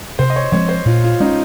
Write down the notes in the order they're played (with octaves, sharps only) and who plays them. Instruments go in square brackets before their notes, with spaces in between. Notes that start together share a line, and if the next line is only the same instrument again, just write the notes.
[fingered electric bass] C3 [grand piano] C5
[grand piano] D#5
C#5
[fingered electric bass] F3 G#3 C4 [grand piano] C#5
[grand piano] C5
[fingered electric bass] A#2 [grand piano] F4
[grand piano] F4
[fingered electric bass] G#3 C#4 [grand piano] D#4